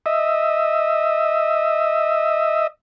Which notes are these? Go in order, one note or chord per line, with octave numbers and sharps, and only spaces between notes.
D#5 E5